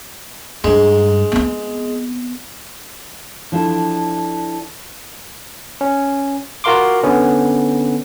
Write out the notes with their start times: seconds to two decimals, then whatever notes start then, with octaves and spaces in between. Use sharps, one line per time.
0.64 G2 G#3
1.32 B3 C4
3.52 F3 D4 E4 A4
5.81 C#4
6.64 F4 F#4 A#4 F5 C6 D6
7.03 D3 B3 C#4